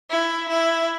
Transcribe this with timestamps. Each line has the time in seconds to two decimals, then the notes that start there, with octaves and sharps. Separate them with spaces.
0.10 E4
0.49 E4